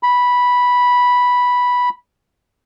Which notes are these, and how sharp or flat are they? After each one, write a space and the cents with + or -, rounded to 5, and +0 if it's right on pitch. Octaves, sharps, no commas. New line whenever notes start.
B5 -5